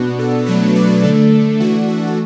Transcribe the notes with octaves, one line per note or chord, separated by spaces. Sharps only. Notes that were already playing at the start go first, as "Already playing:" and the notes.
Already playing: B2 B3 D4 F#4
A4
B2 F#3 A3 D4 B4
B4
D5
D3 A3 D4 A4
E3 A3 D4 F#4
A4
F#4